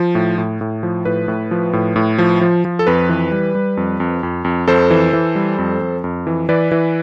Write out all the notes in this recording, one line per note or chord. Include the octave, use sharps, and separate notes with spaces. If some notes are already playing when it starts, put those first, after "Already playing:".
Already playing: F3
A2
A2
A2
F3
A2 B4
A2
F3
A2
A2
F3
F3
F3
A4
F2 B4
E3
G3
G3
F2
F2
F2
F2
F2 A4 C5
E3
E3
G3
F2
F2
F2
E3
E3 B4 D5
E3